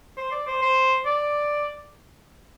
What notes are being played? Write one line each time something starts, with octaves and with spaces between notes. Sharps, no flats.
C5
D5
C5
C5
D5